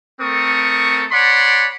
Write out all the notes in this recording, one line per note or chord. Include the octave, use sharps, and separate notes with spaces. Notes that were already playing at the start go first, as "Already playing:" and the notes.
A3 C4 A4 A#4 C#6 D#6
C#5 D5 F#5 A5 B5 C6